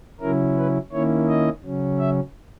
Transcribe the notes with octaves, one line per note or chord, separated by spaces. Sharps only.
C#3 F#3 C#4 E4 A#4
B4
D#3 A#3 C#4 E4 C#5
D#5
C#3 F#3 C#4
E5